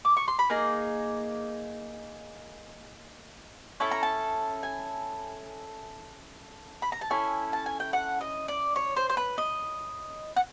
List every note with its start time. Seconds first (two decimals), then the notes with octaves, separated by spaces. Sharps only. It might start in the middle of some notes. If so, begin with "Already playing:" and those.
0.05 D6
0.17 C#6
0.28 C6
0.39 B5
0.50 A#3 D#4 G#4 A#5
3.80 C#4 E4 A4 A5
3.91 A#5
4.03 A5
4.63 G#5
6.82 B5
6.92 A#5
7.01 A5
7.10 C#4 E4 A4 G#5
7.53 A5
7.66 G#5
7.80 G5
7.93 F#5
8.21 D#5
8.48 D5
8.76 C#5
8.96 C5
9.10 C5
9.17 B4
9.38 D#5
10.36 F#5